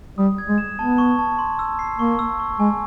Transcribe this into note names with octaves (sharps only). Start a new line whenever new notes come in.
G3 D#6
G#6
G#3
E7
B3 A5
C#6
A5
C6
E6
C7
A#3 C#6
E6
C#6
G#3 G#5